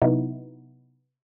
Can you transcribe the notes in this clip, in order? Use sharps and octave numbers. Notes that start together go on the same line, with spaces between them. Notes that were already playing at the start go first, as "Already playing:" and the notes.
C3 F#3 B3 D#4 E4